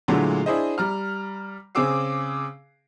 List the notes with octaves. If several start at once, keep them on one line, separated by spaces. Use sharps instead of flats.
A#2 D3 F#3 G#3 A3 E4
D4 E4 G#4 C5 D#5
G3 A#5 F6
C#3 C4 G#4 D6 E6 C7